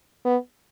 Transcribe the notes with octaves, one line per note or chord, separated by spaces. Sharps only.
B3